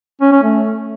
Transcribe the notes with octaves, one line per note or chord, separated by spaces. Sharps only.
C#4
C#4
A3